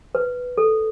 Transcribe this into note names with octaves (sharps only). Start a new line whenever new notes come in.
B4
A4